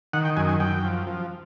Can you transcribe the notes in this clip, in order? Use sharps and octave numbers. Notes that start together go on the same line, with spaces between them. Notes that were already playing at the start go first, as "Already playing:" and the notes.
D#3 F#5
G5
F#2 G#5
G#5
F#2 G5
F3
F3